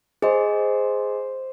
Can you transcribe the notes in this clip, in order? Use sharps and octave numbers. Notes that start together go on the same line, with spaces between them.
G#4 C5 D#5